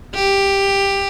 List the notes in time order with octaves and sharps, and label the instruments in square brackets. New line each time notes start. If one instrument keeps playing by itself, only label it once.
[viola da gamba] G4